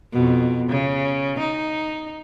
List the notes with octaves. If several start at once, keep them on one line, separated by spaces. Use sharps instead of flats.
F2 B2
C#3
D#4